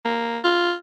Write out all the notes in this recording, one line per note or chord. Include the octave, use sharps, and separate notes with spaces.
A#3
F4